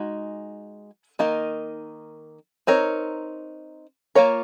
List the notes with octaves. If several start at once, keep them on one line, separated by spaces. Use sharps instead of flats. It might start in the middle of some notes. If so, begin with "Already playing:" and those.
Already playing: G#3 D#4 F#4
D#3 A#3 D#4 A#4 D#5
C4 D#4 A#4 C#5
A#3 F4 A#4 C#5